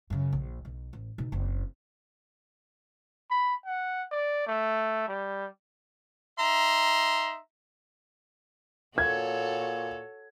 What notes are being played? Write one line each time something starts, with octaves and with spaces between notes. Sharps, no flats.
F#2 C#3
A#1
B1
A1
B2 D#4
F#1 C4
B5
F#5
D5
A3
G3
D#4 E5 A#5 C6
A#2 F#4 A4 C#5 G#6